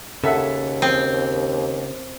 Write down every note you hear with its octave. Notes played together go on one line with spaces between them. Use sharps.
D#2 C#3 A4 E5 F#5
C4